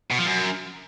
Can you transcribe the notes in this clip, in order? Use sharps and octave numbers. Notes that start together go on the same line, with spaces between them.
B2
F3
F#2